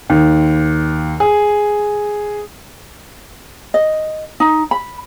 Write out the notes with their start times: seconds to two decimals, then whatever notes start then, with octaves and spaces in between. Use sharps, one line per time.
0.10 D#2
1.20 G#4
3.74 D#5
4.40 D#4
4.71 B5